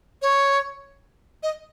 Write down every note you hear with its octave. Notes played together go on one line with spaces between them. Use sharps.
C#5
D#5